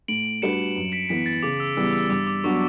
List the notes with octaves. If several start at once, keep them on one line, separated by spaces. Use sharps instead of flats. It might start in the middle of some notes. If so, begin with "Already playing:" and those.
A2 D7 F#7
G3 D4 F#4 B4 C#7 E7
F#2
B6 D7
E3 B3 B6
A6
C#3 D6
E6
E3 G3 B3 E6
E6
G2 D6
D6
F#3 B3 D4 F#4 C#6